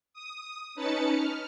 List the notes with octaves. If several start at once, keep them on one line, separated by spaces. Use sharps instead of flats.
D#6
C#4 D#4 B4 A5 A6 C#7
F6